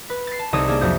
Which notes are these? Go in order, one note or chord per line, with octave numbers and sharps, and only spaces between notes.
B4
A6 C7
A5
C2 D#4 A4 C#5 D#6 D#7
A#3 D4 G#4 A4
F2 F#3 A3 F#4 D#6 G6